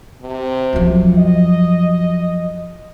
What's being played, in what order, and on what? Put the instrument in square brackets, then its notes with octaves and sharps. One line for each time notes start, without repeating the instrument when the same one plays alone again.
[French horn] C3
[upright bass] F#2 F3
[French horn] D#5